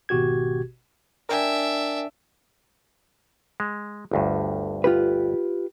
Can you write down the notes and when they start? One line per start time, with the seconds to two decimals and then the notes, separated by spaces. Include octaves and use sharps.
0.09 G#1 B2 F#4 G4 G#6
1.29 D4 A#4 E5 G5 G#5
3.60 G#3
4.11 G1 D2 G2
4.84 F4 G4 B4